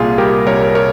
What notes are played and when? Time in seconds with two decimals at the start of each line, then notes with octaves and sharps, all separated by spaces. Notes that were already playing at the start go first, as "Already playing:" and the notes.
Already playing: C2 A#2 F4 G#4
0.18 G3 G4 A#4
0.46 C2 A#4 C#5
0.75 A#4 C#5